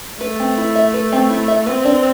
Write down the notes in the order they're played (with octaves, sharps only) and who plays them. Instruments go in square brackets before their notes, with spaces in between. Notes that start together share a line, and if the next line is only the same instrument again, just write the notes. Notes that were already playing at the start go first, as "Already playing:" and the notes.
[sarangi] A3 [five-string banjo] B4
[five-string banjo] C4
E4
E5
B4
C4
E4
E5
[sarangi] C4 [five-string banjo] B4
[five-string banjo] D4